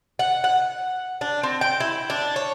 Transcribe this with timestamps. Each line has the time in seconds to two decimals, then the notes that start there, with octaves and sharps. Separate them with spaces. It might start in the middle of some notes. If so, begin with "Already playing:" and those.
0.19 F#5
0.44 F#5
1.21 D4
1.43 C4
1.61 G5
1.80 E4
2.10 D4
2.36 C#5